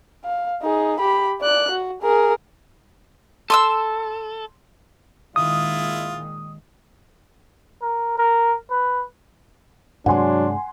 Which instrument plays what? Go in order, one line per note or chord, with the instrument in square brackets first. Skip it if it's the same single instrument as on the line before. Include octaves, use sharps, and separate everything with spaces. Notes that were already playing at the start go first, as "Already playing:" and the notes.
[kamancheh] F5
D#4 G#4
G4 B5
D5 F#6
F#4
G#4 A#4
[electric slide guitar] A4 [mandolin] C6 D#6 E6
[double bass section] A#2 D#3 G#3 [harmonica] E4 F4 [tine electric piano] D#6
[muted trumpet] A#4
A#4
B4
[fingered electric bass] G2 C3 G#3 [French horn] F#3 [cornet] D4 [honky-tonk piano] F#5 G#5 C6